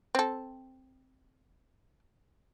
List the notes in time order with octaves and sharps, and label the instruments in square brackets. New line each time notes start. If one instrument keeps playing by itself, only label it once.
[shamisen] C4 A4